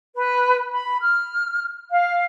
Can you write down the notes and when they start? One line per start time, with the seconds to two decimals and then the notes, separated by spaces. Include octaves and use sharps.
0.16 B4
0.71 B5
1.00 F6
1.90 F5